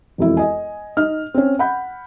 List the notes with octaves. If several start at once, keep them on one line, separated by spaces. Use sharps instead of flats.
E1 F2 E4
D#5 G#5
D#4 D#5 F6
C4 C#4
F#5 B5 G6